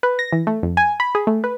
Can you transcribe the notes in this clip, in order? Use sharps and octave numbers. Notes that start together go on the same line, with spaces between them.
B4
A#6
E3
A3
F2
G#5
B5
G#4
A3
B4